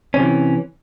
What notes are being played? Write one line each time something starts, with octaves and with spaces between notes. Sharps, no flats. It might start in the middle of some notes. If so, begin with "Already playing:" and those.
C3 E3 F3 C#4